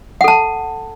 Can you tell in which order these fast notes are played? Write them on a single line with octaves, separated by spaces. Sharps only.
F#5 A4 A5